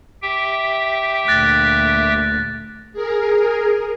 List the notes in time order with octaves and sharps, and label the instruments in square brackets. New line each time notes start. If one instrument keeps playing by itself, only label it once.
[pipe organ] G4 E5 G5
[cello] D2 A#2 [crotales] F#6 A6 A#6
[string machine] G#4 A#4